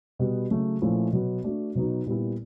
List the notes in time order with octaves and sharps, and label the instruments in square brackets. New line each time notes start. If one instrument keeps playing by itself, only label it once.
[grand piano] B2 G3 B3
C#3 F#3 A3
A#2 F3 A3 C#4 E4
B2 F#3 B3
A3 D4 F#4
B2 F#3 B3 D#4 F#4
A#2 G3 B3 E4